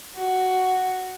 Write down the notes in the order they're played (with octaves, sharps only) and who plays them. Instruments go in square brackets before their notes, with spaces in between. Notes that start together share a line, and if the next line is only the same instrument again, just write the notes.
[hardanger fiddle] F#4